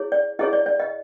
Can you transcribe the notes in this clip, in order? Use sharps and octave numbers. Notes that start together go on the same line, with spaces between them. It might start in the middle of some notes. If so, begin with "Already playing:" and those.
Already playing: E4 G#4 C#5
D5
E4 G#4 C#5 D#5
D5
D5
D#5